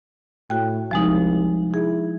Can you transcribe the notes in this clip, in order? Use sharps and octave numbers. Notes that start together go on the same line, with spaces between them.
A2 F#4 G5
C2 F3 G#3 D#4
E4 G#4